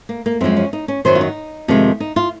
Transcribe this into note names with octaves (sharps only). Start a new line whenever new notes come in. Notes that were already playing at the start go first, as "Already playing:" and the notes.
A#3
A#3
F#2 F3 G#3 C4
C#4
D#4
C#4
F#2 D#3 F#3 C5
F4
D#4
F2 C3 D#3 G#3
D#4
F4